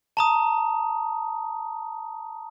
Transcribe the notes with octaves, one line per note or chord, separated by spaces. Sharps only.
A5 A#5 D#6